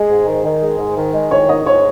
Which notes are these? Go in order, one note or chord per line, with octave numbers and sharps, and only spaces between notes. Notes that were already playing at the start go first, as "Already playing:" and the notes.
Already playing: G#3 G#4
G#2
D#3
D#3
G#3
G#2
D#3
G#3
D#3 C#5
G#2 D#5
G#2 C#5